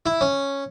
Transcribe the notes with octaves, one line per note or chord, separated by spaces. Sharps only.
E4
C#4